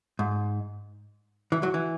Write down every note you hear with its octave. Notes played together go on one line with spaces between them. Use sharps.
G#2
E3
F#3
E3